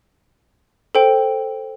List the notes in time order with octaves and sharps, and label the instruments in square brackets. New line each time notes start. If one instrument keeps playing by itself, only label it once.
[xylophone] A4 C5 G5